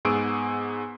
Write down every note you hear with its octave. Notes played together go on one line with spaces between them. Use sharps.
G#2 B3 G#4 C#6 E6 D7